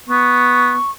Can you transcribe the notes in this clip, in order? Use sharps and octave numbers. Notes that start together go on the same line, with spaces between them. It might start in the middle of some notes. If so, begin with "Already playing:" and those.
B3 C#6